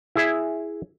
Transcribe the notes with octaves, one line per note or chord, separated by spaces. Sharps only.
E4 G#4 E5